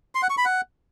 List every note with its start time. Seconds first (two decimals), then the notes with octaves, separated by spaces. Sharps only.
0.15 C6
0.22 F#5
0.30 C#6
0.38 B5
0.45 F#5